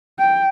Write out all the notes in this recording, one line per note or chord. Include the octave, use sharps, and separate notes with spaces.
G5